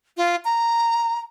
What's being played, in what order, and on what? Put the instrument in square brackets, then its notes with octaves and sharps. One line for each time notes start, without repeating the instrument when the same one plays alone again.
[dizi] F4
A#5